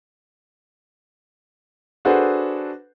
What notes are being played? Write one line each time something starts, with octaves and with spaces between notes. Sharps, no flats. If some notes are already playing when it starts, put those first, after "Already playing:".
D4 F#4 G#4 A4 B4 C5